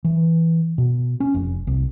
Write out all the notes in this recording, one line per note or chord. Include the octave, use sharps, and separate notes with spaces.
E3
B2
C#4
F1
C2